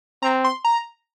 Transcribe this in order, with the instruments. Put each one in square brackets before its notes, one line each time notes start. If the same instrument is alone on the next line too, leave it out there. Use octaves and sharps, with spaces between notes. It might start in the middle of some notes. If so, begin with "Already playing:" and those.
[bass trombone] C4 [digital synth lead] A#5
[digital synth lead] C6
A#5